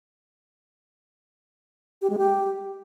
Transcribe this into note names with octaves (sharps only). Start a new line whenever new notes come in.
G4
G#3
G4